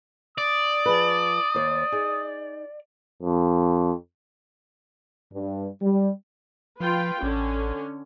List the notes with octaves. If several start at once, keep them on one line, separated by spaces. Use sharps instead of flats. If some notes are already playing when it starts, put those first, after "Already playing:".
D5 D#6
F3 G#4 B4
D#2 C5
D#4 G#4
F2
G2
G3
F3 F4 B4 G5
A1 D3 C#4